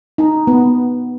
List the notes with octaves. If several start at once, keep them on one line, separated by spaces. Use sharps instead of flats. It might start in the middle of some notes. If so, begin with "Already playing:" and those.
D#4
B3